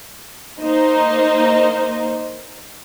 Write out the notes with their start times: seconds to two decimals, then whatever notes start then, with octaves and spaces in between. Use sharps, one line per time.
0.60 A#3 D#4 C5